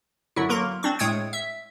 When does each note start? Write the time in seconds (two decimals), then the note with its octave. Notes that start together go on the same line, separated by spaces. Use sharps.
0.36 F#2 D3 F#3 E4
0.49 F#3 A#3 A#4 C6
0.83 C4 D4 C#6
0.99 A2 G#3 G5 D#6 G#6 C#7
1.33 E5